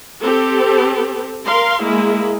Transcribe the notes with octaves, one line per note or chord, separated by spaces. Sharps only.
C4 G4 A4
A#4 F5 C6
G#3 A#3 E4